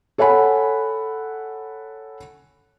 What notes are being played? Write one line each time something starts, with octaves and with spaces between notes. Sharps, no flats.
A4 C#5 F#5 G#5 B5